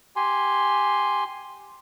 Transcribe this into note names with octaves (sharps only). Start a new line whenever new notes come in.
G4 G#5 C6